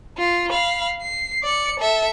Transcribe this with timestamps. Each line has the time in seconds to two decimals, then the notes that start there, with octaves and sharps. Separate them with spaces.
0.18 F4
0.50 F5 B5
1.02 C7
1.43 D5 C#7
1.79 A4 E5